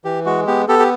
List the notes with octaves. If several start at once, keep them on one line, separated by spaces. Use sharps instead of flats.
E3 G4
G#3 F#4
B3 G4
B3 G4 A4
G4